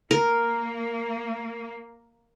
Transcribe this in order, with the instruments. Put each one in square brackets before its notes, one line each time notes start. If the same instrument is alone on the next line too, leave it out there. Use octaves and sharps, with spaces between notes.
[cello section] A#3 [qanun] A#4